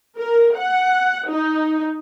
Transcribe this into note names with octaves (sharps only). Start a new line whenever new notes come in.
A#4
F#5
D#4